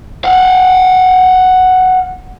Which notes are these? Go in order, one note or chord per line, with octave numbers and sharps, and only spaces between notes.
F5 F#5